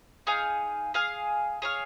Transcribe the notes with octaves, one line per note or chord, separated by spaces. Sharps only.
D#4 G#4 F5 G#5
G#4 F5 G#5
G#4 C#5 F5